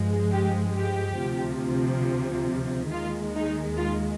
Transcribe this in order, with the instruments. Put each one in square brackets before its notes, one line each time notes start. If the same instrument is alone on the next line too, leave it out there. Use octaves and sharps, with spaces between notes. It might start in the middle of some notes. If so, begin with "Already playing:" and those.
Already playing: [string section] G2 F3 G#3
G4
G4
D2 C3 F3
D#2 D#3 G#3 F4
D#4
F4